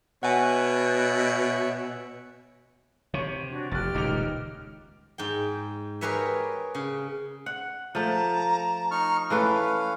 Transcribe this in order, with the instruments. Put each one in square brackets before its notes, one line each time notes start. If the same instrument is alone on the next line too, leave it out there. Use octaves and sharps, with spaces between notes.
[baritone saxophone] B2 [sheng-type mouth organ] C#5 E5 F#6 [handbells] F#5 G#5
[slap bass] C3 [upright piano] C#5 C#6
[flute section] D4 F#4
[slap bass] F1 [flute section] G4 F6 [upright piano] F#6 A6
[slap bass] D#1 C#2 A#2 [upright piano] D#4 D6 F7
[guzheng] G#2 G5
G4 G#4 A#4 B4 C#5 E5
C#3
[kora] F#5
[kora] F3 A3 [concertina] A5 [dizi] A#5
[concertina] D#4 C#6 F6
[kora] E3 A3 B4 [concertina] C#4 F5 [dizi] B5